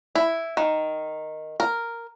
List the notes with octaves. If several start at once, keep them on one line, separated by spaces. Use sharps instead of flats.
E4
D#3
A#4